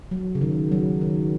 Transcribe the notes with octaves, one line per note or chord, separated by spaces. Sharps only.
F#3
C#3
D#3
F#3
D#3